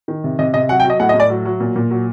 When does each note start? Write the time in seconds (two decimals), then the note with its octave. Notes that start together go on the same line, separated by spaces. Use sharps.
0.08 D#3
0.24 C3
0.39 C3 D#5
0.54 C3 D#5
0.69 F#3 F#5
0.80 G5
0.85 F#3
0.90 D#5
1.00 A2 F#5
1.09 D#5
1.14 A2
1.20 D5
1.30 F#3
1.45 F#3
1.60 A#2
1.76 A#2
1.91 F#3